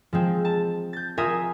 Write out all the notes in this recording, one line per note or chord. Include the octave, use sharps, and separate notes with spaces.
F3 G#3 C4
A5
G6 A6
F4 A#4 E5 G#5 C6 D#6